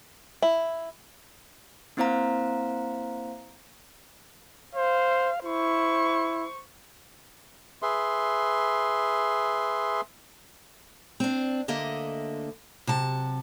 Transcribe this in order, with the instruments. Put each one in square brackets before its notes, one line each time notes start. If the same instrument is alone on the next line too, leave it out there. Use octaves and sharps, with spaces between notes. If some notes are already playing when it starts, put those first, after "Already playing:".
[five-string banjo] E4
[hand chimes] A#3 C4 E4 C5 F5 A#5
[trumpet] C5 [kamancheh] F5
[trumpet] E4 [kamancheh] C5 C#6
[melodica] G#4 B4 E5 C6
[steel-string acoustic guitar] C4 D4
D2 D3 A#3 D#5 E5
C3 F#3 A5